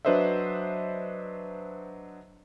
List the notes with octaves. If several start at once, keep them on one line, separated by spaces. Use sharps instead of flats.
F#3 D4 B4 C5 D#5 E5